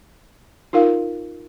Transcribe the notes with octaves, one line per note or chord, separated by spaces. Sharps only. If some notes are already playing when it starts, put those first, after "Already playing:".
D#4 F4 A#4 F5